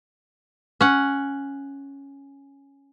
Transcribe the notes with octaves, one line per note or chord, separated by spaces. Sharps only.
C#4 F#5